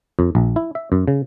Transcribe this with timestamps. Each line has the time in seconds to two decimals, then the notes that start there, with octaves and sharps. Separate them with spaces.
0.19 F2
0.35 A#1
0.56 E4
0.75 E5
0.92 F#2
1.08 C#3